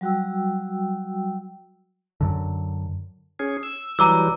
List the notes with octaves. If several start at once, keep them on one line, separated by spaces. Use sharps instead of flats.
F#3 G3 F#4 G5 E6
F#2 D3
C#4 G#4
E6
E3 F#3 G3 A#5 D6 E6